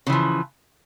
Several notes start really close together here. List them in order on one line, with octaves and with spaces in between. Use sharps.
C#3 E3 F3